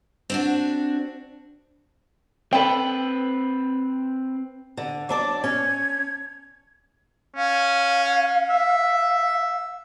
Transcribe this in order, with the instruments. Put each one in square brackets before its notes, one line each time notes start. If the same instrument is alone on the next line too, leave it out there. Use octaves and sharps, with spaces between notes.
[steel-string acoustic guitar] C4 D4 F#4
[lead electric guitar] C4 B4 [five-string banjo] A4 G5
[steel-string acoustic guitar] D3
[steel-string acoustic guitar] F#3 D4 D5 [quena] D6
[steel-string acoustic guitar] C#4 [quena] G#6
[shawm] C#4 [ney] F5
[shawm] E5